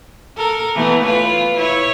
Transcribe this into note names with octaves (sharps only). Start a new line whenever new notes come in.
A4 A#4
E3 A3 B3
F4 B4 C#5
E4 C#5